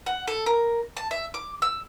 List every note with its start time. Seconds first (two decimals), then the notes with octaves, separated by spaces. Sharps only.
0.06 F#5
0.27 A4
0.46 A#4
0.97 A5
1.11 E5
1.34 D6
1.62 E6